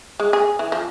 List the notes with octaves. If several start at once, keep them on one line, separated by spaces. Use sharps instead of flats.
G#3
G#4
E3
F3